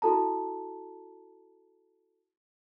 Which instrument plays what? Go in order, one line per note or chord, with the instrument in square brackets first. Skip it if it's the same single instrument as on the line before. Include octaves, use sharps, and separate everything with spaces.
[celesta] E4 F#4 A4 A5 A#5